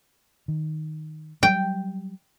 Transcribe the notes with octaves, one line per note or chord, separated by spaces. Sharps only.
D#3
F#3 G3 G5